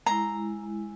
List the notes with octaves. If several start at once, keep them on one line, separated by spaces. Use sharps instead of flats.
G#3 E4 A#5